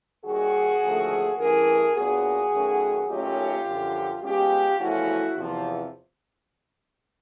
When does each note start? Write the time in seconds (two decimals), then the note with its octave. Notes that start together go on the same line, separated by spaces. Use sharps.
0.24 D#2 D#3 G3 F#4 G#4
0.82 D#2 D3 F3 A3
1.38 G2 E3 A3 C#4 G#4 A#4
1.95 A#2 F#3 B3 D4 F#4 G#4
2.52 F#2 D#3 F#3 A3 C#4
3.08 D#2 D#3 F#3 A3 C#4 F4 G4
3.65 F#2 D3 F3
4.23 B2 G#3 C#4 F4 G4
4.79 E2 C#3 F3 A3 C#4 E4 F#4
5.36 E2 C3 F3